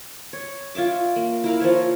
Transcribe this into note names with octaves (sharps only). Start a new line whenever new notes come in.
C#5
F4 C#5 E5 D6
A#3
E4 A#4 F5
F3 F4 C#5 E5